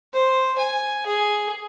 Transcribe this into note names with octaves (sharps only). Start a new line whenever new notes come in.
C5
G#5
G#4